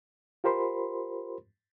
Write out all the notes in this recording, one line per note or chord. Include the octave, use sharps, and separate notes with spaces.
F4 G4 A#4 C5 B5 C6